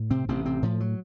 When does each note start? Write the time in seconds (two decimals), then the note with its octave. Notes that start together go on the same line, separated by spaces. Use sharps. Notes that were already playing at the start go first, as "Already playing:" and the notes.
Already playing: A2
0.10 C3 C4
0.28 A1 C3 C4
0.45 C3 C4
0.62 A2 F3
0.80 F#3